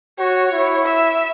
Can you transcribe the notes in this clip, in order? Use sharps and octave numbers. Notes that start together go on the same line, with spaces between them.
F#4 C#5
E4
E5